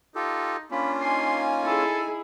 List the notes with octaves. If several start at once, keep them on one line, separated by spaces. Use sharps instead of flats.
D#4 F4 G4 A4
A#3 C#4 D4 F4 B5
D#4 G#5 C6
E4 G#4 A4